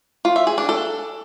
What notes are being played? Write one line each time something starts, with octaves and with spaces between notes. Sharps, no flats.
F4
E5
G#4
D4
A4